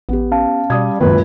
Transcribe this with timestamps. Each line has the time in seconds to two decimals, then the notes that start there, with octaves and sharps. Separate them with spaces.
0.09 A1 B3 G4
0.32 C#4 F5 A5
0.70 B2 G3 D5 D#6 G#6
1.01 C#2 F#2 A#2 D#3 B4